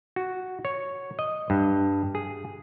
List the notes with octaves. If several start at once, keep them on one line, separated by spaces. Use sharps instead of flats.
F#4
C#5
D#5
G2
G#4